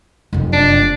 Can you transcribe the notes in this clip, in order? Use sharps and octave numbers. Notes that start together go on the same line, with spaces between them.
F1 F#2
D4